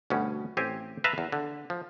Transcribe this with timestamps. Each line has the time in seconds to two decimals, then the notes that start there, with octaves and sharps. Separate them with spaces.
0.10 D2 G2 B2 C#4
0.57 A1 C4 G4 G#5
1.04 B4 E5 F5 A5 A#5
1.18 E2
1.32 D3
1.70 F3